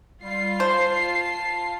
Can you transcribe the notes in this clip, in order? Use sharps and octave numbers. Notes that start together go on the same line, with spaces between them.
G3 F4 C7
C5 A5